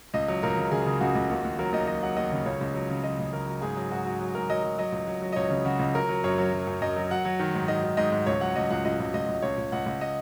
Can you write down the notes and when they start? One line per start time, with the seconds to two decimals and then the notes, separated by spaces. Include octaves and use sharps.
0.14 C#2 D#5
0.28 F#3
0.43 C#2 A#4
0.57 C#3
0.72 C#3 G#4
0.86 C#3
1.01 C#2 F#4
1.15 C#2
1.30 D#2 F#4
1.45 D#2
1.59 F#3 A#4
1.73 D#2 D#5
1.87 F#3 D#5
2.03 F#3 F#5
2.16 D#2 D#5
2.32 C#3
2.45 C#2 C#5
2.61 C#2
2.74 F#3
2.90 C#3
3.04 F#3 D#5
3.19 C#2
3.33 C#3 A#4
3.47 F#3
3.62 G#2 G#4
3.77 F#3
3.91 G#2 F#4
4.05 F#3
4.21 F#3
4.35 G#2 A#4
4.50 F#3 D#5
4.63 F#3
4.78 F#3 D#5
4.92 C#2
5.07 F#3
5.22 F#3
5.33 D#5
5.36 C#2 C#5
5.50 C#3
5.65 C#3 F#4
5.79 C#2
5.94 F#3 A#4
6.09 F#3
6.24 F#2 C#5
6.38 F#3
6.53 F#3
6.67 F#2
6.82 F#2 D#5
6.96 F#3
7.11 F#3 F#5
7.25 F#3
7.39 D#3
7.54 G#2
7.68 D#3 D#5
7.84 D#3
7.97 G#2 D#5
8.12 G#2
8.26 C#2 C#5
8.41 F#3 F#5
8.56 C#2 D#5
8.70 C#2 F#5
8.85 C#2 D#5
9.00 C#2
9.14 C#2 D#5
9.28 C#2
9.42 C#2 C#5
9.57 C#2
9.72 C#2 F#5
9.86 C#2
10.01 D#5